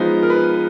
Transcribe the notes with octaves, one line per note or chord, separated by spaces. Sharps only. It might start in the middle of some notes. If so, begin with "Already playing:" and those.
Already playing: F3 G#3 B3 D#4
A#4
B4